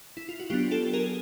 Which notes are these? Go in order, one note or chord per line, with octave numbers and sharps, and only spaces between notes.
E4
F4
F#4
F#3 B3 D4 F4 G4
G4 A4
G#4 A#4